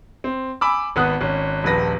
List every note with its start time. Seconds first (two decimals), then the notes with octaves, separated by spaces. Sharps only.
0.24 C4
0.61 G#5 B5 D6 E6
0.96 G#1 B3 D#6 F#6
1.21 G#1 C#4
1.64 D#1 A#1 B4 A#6